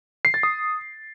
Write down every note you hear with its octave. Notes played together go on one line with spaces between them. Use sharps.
C7
A6
D#6